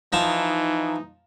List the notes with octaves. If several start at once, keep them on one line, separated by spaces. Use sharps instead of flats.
E3 F3 D#4 A5 A#5